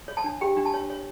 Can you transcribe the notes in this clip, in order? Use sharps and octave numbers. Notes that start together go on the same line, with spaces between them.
C#5
A5
D4
G4 G5
D4
A5
C#5
C#5